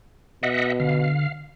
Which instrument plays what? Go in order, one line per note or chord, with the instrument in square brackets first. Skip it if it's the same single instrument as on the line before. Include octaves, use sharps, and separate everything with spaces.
[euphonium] B2 [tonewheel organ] D#5 E5 F#5
[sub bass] D3 [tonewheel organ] F5